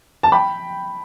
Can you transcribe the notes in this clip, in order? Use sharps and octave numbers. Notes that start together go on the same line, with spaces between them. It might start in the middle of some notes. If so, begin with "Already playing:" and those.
A5
G5 B5